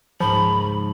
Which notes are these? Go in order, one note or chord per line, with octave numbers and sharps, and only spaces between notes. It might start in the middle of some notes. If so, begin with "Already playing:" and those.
C#2 G#2 F3 A#5 B5